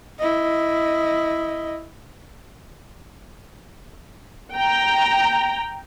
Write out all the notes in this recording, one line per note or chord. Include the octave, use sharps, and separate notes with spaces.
E4 D#5
G5 A#5